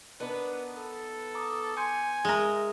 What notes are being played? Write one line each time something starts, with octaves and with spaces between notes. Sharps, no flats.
B3 D4 D#4 A#4 B4
A4
A#5 D6 D#6
G#5 C6 G6 C#7
G#3 A#4 E5 D#6